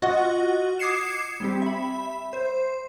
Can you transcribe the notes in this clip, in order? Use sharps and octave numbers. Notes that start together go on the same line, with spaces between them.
F4 F#4 D#5 F#5
D6 D#6 G#6 C7 C#7 E7
G3 C4 G4
E5 B5
C5